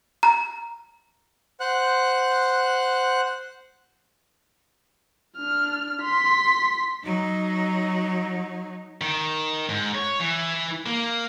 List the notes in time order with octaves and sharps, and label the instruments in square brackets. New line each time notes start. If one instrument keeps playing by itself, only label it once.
[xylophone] A#5
[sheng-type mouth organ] C5 F#5 F#6
[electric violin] D4 F6
C6 B6
[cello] F#3 D#4
[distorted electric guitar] D#3
G#2
C#5
E3
A#3